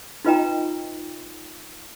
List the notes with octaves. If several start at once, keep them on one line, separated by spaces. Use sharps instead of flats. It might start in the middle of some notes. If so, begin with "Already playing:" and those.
D#4 F4 B4 D#5 G5 A#5